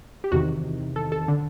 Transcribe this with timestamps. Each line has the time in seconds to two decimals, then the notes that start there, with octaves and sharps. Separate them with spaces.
0.24 G4
0.32 E2 C3 D#3 F#4
0.96 A4
1.12 A4
1.28 D3